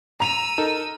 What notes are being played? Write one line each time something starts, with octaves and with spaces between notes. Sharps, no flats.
A#5 E6 D#7 F7
D#4 A4 A#4